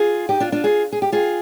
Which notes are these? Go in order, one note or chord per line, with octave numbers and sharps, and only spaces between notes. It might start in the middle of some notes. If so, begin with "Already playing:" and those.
Already playing: F4 G#4
D#4 G4
D4 F4
D4 F4
F4 G#4
G#4
G4
F4 G#4